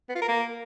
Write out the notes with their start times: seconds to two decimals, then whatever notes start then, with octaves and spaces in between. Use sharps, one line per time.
0.09 B3
0.16 F4
0.22 A#4
0.29 A#3